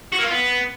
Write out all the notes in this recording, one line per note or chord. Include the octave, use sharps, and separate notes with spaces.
F#4
A#3
F4
B3